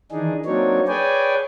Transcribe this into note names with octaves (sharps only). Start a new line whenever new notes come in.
D#3 E3 D4 D#4 G#4
F#3 A#3 C4 D4 D#4 C#5
G#4 B4 C#5 D5 G5 G#5